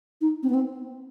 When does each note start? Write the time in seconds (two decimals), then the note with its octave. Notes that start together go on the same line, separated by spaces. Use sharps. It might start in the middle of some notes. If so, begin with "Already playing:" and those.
0.21 D#4
0.43 C4
0.49 B3
0.54 C4